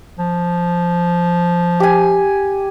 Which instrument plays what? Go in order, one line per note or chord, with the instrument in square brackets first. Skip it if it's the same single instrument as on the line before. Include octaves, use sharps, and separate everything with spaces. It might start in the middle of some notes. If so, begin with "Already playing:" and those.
[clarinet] F3
[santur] G4 G#5